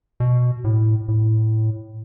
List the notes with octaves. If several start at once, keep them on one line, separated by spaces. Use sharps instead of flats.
B2
A2
A2